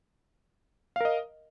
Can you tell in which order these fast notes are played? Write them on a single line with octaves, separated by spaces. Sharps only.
F5 A#4 D#5